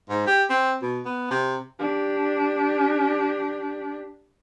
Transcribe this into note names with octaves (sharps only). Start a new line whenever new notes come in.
G#2
G4
C4
B2
B3
C3
D4 G4